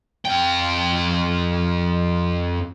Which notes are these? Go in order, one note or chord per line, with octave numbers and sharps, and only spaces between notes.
F2 G5